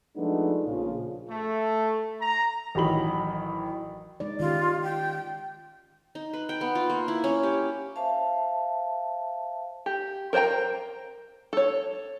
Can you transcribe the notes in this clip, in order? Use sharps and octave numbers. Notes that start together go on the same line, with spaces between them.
F3 G#3 A3 B3 D4 D#4
A#1 C#3 F3 F4
A3
A#5
A1 D#3 F#3 B5 F#7
G#3 D#4 D5
D#3 C#4 F4 G4
G5
D#4
B4
G5
B3
F4
A#3
E4
C#4
G4
C5 E5 F5 A5
G4
A#4 C5 D5 G5 A#5
A4 C#5